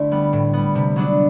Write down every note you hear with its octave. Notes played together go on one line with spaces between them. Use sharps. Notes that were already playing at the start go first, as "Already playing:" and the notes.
Already playing: D3 A3 E4
G3 B3
A2
G3 B3
C3
F#3 B3 D4